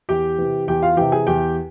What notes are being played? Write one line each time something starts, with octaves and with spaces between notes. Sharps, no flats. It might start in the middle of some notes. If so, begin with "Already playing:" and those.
E2 G4 G5
C3 E3
E2 G4 G5
F4 F5
C3 E3 G4 G5
G#4 G#5
E2 G4 G5